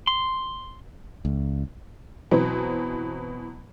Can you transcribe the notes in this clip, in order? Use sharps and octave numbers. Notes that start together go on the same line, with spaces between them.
C6
C#2
B2 E3 F#3 B3 C4